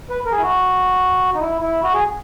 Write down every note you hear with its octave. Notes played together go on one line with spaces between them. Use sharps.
B4
A#4
G#4
E4
F#4
D#4
E4
E4
F#4
G#4